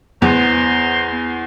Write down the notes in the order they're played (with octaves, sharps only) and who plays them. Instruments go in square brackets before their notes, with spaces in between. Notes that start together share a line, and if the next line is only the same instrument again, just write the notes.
[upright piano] E2 [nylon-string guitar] B3 [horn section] C5 A#5 C6